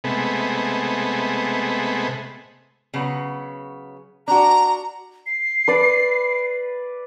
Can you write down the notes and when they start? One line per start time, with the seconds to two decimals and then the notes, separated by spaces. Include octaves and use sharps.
0.04 C3 G#3 A3 B3
2.94 C#3 F#3 B3
4.28 D4 F#4 A#5
5.26 C7
5.68 B4 D5